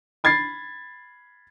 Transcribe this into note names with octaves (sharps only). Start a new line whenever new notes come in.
B5 G#6 A6 C7